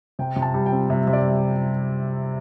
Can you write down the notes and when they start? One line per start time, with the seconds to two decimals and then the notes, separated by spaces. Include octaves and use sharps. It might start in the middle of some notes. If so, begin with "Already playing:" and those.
0.19 C3 G5
0.36 C3
0.42 A5
0.54 G3
0.66 G5
0.72 C4
0.90 C3 E5
1.07 C3 E5
1.13 D5
1.25 G3